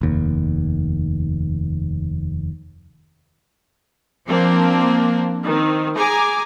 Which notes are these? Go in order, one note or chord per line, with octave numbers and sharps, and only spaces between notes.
F1 D#2
F3 A#3 C4 D4
D#3 C4
G#4 G#5 A#5 D6